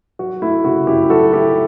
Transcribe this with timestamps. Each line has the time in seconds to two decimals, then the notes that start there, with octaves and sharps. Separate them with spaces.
0.19 F#3 F#4
0.42 A3 E4
0.64 C#3 F#4
0.87 F#2 E4 G4
1.10 F#3 F#4 A4
1.32 A3 E4 G4